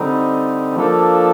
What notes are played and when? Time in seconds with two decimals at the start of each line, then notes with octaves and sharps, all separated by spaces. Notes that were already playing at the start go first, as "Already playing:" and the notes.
Already playing: D3 G3 C4 D#4
0.75 F3 A#3 D4 A4